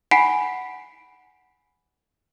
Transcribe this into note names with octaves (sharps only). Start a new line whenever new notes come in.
F#5 G#5 B5 B6 C7 D7